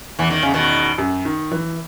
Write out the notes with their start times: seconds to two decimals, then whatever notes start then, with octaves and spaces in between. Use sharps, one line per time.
0.19 E2 E3
0.31 D#3
0.43 C#3
0.54 B2 D#3
0.98 F#2
1.25 D#3
1.52 E3